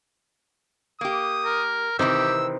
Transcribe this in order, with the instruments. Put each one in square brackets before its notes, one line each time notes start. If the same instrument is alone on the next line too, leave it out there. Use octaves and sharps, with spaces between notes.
[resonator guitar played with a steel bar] A#3 G4 [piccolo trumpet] D#6
[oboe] A#4
[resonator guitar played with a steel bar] C3 D#3 E3 [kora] C4 D#4 C5 [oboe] G4 [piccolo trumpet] E6